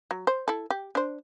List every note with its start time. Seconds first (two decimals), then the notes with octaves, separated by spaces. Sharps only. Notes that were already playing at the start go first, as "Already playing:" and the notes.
0.11 F#3
0.27 C5
0.48 E4 A4
0.70 G4
0.95 D4 C5